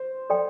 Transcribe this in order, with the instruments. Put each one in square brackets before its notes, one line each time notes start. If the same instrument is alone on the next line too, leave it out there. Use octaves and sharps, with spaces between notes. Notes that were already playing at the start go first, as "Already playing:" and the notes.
Already playing: [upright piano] C5
[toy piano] A4 D5 G5 C6